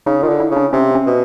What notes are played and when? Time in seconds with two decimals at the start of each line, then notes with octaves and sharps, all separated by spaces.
0.06 C#3 D#4
0.23 D#3 F4
0.29 D3
0.40 E4
0.51 C#3
0.56 D4
0.73 C3 C#4
0.95 C#4
1.06 B2